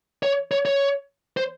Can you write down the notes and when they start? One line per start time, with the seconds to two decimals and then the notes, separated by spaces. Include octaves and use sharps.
0.23 C#5
0.51 C#5
0.65 C#5
1.37 C5